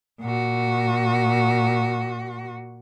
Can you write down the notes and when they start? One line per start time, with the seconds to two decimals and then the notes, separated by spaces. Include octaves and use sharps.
0.21 A#2 F#4